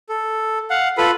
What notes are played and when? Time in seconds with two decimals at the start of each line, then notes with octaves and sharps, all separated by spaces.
0.09 A4
0.70 F5 F#5
0.98 F4 A4 B4 B5